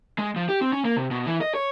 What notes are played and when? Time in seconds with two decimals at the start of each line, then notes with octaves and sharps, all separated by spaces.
0.18 G#3
0.36 F3
0.49 G4
0.61 C4
0.73 C#4
0.85 A#3
0.96 C3
1.11 B2
1.27 E3
1.41 D#5
1.55 C#5